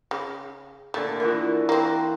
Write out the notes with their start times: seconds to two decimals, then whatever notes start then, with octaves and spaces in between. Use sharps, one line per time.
0.11 C#3
0.94 A#2 D3 A3
1.20 E3 F4 F#4 A#4
1.69 A#3 C4